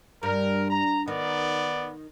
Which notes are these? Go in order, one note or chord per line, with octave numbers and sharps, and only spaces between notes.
G2 A#4
A#5
D#3 B3 D5